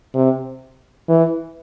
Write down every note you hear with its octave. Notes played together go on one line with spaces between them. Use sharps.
C3
E3